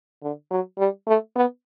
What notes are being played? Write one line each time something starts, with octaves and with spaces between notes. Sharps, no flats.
D3
F#3
G3
A3
B3